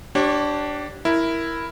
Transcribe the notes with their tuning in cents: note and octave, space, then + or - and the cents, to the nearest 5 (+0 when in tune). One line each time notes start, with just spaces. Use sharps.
D4 +0 G4 -25 C#5 -35
E4 +0 A#4 +0